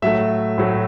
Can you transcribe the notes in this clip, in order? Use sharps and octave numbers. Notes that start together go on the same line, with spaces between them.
A2 F#3 A3 E5
A2 F#3 A3